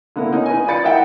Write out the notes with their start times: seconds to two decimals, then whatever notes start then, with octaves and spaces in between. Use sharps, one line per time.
0.16 D3 A#3 B3 E4
0.32 C#4 D#4 A#4
0.46 B4 G#5
0.67 F4 D5 B5 A6 C#7
0.83 D#4 E4 A#4 E5 F#5 G5